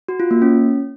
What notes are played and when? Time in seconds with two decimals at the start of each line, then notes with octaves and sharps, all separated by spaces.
0.08 F#4
0.20 F4
0.31 A#3
0.42 C#4